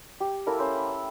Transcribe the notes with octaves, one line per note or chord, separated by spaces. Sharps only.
G4
A3 A#3 E4 A#4
C#4 C5
B5
E6